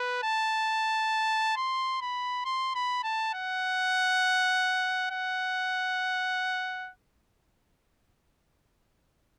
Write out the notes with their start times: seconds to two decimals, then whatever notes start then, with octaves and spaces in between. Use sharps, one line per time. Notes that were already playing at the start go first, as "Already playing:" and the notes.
Already playing: B4
0.23 A5
1.56 C6
2.01 B5
2.45 C6
2.75 B5
3.04 A5
3.34 F#5
5.10 F#5